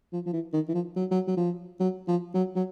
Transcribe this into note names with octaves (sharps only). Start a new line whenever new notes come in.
F3
F3
E3
D#3
E3
F3
F#3
F#3
F#3
F3
F#3
F3
F#3
F#3